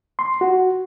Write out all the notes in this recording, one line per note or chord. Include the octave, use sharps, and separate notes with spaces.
C6
F#4